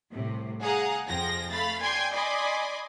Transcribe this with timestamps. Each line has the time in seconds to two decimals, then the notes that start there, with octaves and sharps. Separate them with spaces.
0.11 C2 A2 C3
0.62 G#4 F5 F#5 A#5 D#6
1.07 F2 F3 G#4 G5 A#6
1.50 A3 F5 B5 A6
1.81 D5 G5 G#5 C6 G#6
2.12 D5 D#5 G#5 B5 C6 D6